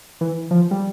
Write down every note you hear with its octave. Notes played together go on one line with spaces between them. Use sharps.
E3
F3
G3